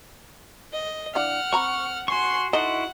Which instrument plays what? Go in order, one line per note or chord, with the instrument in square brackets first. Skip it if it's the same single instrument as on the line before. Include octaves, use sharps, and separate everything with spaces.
[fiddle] D#5
[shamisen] E3 D4 F5 [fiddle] F#5 F6
[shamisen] C4 A#5 B5 [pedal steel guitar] C#6
[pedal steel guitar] F#4 C#6 [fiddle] G#5 C6
[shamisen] D#4 A4 D#5 [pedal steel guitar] E4 F#4 C6 [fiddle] F#5